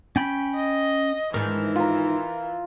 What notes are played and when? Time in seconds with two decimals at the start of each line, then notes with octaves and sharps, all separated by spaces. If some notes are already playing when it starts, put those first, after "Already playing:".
0.16 C#4 G5 B5
0.55 D#5
1.34 G#2 D#3 E3 D4 A#4
1.76 F4 A#5